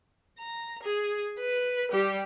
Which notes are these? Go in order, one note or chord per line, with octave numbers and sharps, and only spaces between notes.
A#5
G#4
B4
G3 G4